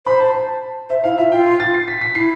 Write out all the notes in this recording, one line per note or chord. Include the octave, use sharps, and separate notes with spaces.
C5 B5
A5
A5
C5 E5
E4 F5
F4 E5
F4 G5
C6
A6
C7
B6
B6
E4 C7